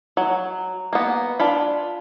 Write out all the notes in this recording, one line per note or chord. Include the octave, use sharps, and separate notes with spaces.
F#3
A#3 B3
D4 F4 B5